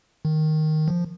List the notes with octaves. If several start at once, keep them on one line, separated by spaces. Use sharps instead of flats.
D#3
F3